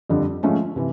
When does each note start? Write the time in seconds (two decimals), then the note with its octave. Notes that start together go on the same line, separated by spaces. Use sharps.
0.10 F2 D3 G3
0.43 G#2 F3 A3 C#4
0.76 C3 E3